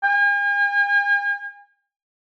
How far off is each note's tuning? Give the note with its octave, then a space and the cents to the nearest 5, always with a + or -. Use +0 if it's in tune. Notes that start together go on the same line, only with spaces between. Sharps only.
G#5 -45